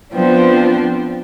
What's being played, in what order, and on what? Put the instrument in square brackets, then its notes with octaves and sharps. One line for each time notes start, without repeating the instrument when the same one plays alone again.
[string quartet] F3 B3 C4 D4